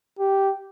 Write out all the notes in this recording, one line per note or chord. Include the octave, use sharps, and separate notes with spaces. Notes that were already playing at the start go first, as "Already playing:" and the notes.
G4